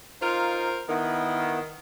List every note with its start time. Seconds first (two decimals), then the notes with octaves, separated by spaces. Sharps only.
0.22 D#4 F4 A#4 C5 F5
0.89 D#3 B3 E4